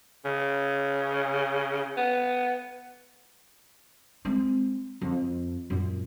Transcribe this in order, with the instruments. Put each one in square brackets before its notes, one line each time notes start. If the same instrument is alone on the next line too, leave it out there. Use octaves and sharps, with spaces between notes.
[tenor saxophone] C#3
B3
[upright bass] G#3 C4
F2
F#2 A#2